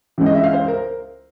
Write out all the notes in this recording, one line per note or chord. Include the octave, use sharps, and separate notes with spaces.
C#2 C#3 E3
D#5
E5
F5
C5
A#4